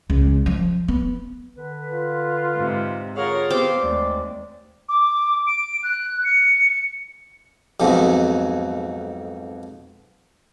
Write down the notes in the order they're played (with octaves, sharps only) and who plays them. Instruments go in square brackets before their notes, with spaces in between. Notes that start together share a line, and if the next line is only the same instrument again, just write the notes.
[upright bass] C#2
F3
B3
[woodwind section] D3 B4
[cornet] F4
[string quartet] G#2 C3
[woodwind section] D3 F4 G#4 [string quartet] A#4 F5 F#5 [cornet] C#5
[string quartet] B3 F5 [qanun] C4 G5 D6 [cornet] G4
[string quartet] D#2 [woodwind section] G#3 A3 [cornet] D5
[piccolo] D6
D7
F#6
C#7
[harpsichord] B1 F2 G#2 B2